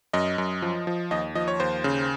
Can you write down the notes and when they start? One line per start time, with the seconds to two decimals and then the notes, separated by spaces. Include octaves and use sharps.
0.13 F#2 D#5
0.38 F#2
0.62 F3
0.87 F3
1.11 D#2 D#5
1.35 F3 D#5
1.48 C#5
1.60 D#2 C5
1.84 C#3